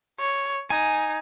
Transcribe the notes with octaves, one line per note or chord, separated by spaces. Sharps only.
C#5
D#4 G#5